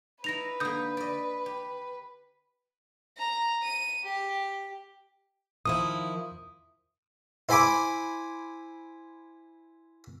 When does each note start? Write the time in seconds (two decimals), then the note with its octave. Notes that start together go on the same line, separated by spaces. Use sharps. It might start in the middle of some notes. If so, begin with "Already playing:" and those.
0.24 D#4 E4 B4 A#6 F7
0.60 D3 A#3 D#6 G6
0.97 D5 D#5
1.46 G4
3.18 A#5
3.63 D#7
4.04 G4
5.65 D#3 F3 E4 D#6
7.49 E4 C5 G#5 B5 D6